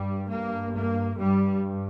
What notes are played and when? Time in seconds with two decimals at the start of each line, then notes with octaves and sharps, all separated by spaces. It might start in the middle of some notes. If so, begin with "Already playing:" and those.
Already playing: G2 G3
0.29 A#3
0.74 A#3
1.17 G2 G3